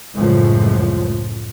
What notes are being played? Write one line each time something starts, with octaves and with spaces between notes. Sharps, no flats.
C#2 F#2 A2 F3 G#3